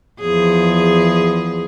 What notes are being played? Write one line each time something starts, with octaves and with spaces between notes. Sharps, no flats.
E2 F3 G#4